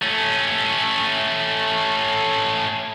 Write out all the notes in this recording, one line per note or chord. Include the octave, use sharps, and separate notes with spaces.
A3 C#4